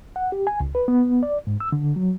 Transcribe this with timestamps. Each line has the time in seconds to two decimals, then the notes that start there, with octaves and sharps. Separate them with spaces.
0.16 F#5
0.32 G4
0.47 G#5
0.60 C#2
0.75 B4
0.88 B3
1.23 D5
1.47 G#2
1.60 E6
1.72 D3
1.96 F#3